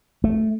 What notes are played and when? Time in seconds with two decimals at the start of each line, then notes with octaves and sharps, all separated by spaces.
0.24 A3